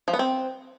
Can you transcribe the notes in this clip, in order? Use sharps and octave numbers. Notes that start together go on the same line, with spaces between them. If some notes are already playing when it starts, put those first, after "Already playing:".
F3
B3
C4